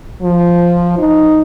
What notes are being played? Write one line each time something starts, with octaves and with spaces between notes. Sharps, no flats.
F3
D#4